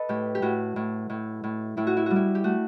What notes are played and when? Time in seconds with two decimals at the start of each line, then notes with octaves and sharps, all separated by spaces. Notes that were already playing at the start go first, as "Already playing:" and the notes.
Already playing: A4 B4 D#5
0.09 A2 G4
0.35 G4
0.42 A2 F#4
0.76 A2
1.10 A2
1.44 A2
1.77 A2 E4
1.87 F#4
1.97 E4
2.06 G3 F#4
2.16 E4
2.35 G4
2.44 A3 F#4